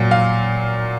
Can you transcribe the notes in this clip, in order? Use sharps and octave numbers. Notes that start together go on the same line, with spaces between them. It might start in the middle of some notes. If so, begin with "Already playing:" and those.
Already playing: A#2 F#3
F5